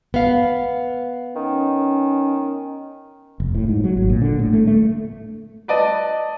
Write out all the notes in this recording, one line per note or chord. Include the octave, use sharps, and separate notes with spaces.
B3 F5
D#3 C#4
F1
A2
G#2
F#3
G#1
A#2
D3
A2
A3
A3
B4 D5 D#5 A5